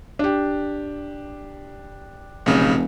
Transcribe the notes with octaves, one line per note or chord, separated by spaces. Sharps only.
D4 G4
F1 B1 C#3